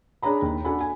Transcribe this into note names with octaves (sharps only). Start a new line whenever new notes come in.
D4 G#4 C#5 A#5 B5
D#2
D4 F#4 A4 G#5 B5
G#5